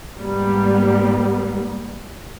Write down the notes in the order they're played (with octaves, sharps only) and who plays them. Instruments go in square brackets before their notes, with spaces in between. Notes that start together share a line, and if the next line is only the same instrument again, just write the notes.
[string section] G#2 G3 A#3 B3